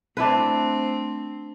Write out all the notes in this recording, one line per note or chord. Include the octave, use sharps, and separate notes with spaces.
A3 C4 D4 E4 B4